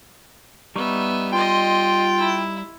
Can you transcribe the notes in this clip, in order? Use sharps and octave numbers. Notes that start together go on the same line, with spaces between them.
G3 B3 D#4 E5 C#6
F4 D#5 G5 C6
E4